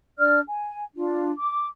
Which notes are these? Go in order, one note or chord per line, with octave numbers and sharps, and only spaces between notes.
D4 D5 F6
G#5
D4 F4
D6